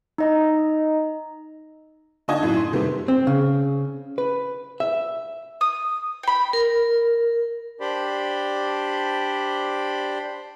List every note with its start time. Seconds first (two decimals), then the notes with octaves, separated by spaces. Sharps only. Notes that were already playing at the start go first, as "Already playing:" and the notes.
0.18 D#4 D#5 A#5
2.28 D3 D#4 D#5 A5 G#6
2.43 F#2 A2
2.57 C6
2.73 C3 D#3 G3 B3
3.08 C4
3.27 C#3
4.18 B4
4.80 E5
5.61 D#6
6.23 G5 B5
6.53 A#4
7.81 D4 G4 C5 D5 B5